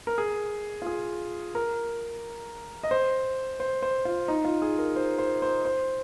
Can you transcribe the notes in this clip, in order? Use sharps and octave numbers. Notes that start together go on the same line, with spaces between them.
A#4
G#4
F4
G#4
A#4
D#5
C5
C5
C5
F4
D#4
F4
G#4
A#4
C5
C5
C5
C5